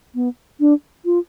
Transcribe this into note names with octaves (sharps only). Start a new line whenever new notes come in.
B3
D4
F4